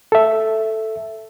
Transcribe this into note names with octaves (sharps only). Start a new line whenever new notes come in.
A4 E5